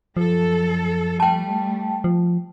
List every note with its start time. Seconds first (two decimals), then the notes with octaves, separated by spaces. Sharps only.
0.17 F#2 F3 A4
1.20 G3 A3 G5 A5
2.04 F3